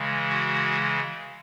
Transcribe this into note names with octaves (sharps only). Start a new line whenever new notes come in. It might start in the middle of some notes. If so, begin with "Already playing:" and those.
Already playing: C#3 E3 G#3
F#4